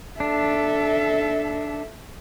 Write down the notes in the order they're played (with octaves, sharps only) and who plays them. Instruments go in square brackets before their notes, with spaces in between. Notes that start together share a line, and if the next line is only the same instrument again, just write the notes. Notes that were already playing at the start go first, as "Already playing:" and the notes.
[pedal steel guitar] D4 [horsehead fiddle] A4 E5